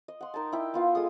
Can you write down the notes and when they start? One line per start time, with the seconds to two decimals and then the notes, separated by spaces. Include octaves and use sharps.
0.08 D#5
0.21 F#5 C6
0.34 D#4 A#4 G5 A5
0.52 E4 G5
0.74 B3 F4 F5
0.95 G#3 G#4 A4 D#6